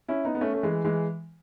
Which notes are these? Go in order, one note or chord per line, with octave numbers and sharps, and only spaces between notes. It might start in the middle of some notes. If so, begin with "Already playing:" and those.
C#4 E4
B3 D#4
B3
A3 C#4
A3
E3 G#3
E3 G#3